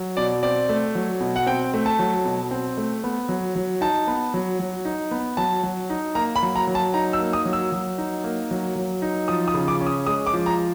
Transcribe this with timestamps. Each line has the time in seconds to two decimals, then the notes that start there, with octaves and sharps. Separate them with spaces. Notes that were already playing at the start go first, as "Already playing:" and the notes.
Already playing: F#3
0.17 B2 D5
0.43 C4 D5
0.69 A3
0.95 F#3
1.20 B2
1.36 F#5
1.46 C4 G5
1.74 A3
1.86 A5
1.99 F#3
2.25 B2
2.51 C4
2.77 A3
3.04 B3
3.29 F#3
3.56 F#3
3.81 D#4 A5
4.07 B3
4.34 F#3
4.59 F#3
4.85 D#4
5.11 B3
5.37 F#3 A5
5.63 F#3
5.90 D#4
6.15 A#3 A#5
6.36 B5
6.43 F#3
6.56 A#5
6.67 F#3
6.75 A5
6.94 D#4 A#5
7.13 E6
7.19 A#3
7.33 D#6
7.46 F#3
7.53 E6
7.72 F#3
7.98 D#4
8.24 A#3
8.51 F#3
8.76 F#3
9.02 D#4
9.28 F3 D#6
9.48 D#6
9.54 C#3
9.68 D6
9.81 C#4
9.86 D#6
10.06 G#3 D#6
10.27 D6
10.33 F3
10.46 A#5